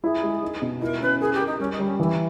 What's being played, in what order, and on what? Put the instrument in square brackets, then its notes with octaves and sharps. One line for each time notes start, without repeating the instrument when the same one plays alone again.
[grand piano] E4 [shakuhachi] G#4
[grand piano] G#3
D#4
B2
[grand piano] E4 [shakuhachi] A#4
[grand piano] C#4 [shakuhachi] B4
[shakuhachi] G#4 [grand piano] A#4
[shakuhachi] G4
[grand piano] A#4
[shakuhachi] D#4
[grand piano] G3 [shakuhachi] C#4
[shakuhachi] D#4
[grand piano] G3
[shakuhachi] C#4
[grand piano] E3 [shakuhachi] E4